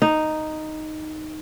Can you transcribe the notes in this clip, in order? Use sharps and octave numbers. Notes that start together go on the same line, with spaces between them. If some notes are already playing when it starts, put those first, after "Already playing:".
D#4